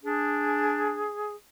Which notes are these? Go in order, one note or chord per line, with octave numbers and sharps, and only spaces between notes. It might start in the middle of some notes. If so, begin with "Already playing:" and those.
D4 G#4